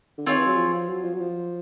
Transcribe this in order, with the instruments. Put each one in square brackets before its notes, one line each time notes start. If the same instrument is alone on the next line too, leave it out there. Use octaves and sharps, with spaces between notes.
[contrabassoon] D3
[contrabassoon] D#3 [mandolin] C4 F4 G#4 C#5
[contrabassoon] E3
F#3
F3
F#3
F3
F#3
F3